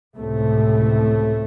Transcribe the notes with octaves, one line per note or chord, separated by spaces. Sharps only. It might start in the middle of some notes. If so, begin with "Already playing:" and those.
C#2 A2 C3 A3